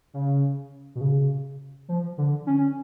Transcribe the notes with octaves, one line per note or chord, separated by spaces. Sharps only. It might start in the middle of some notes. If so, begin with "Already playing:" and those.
C#3
B2
C#3
F3
D3
C#4